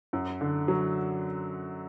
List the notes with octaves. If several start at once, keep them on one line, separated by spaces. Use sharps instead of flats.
F#2
D3
F#3